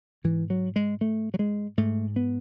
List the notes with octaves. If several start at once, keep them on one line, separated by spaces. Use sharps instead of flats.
G#2 E3
F#3
G#3
A3
F#3
G#3
G#2 A3
B3